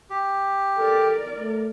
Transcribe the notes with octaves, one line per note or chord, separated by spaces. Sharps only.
G4
A4 A#4 D5
A3